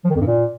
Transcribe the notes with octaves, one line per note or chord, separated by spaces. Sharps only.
F3
D#3
F2
G2
A#2